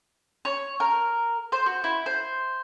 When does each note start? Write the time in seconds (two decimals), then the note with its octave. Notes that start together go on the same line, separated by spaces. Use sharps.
0.45 C#5
0.80 A#4
1.52 C5
1.66 F#4
1.84 E4
2.06 C5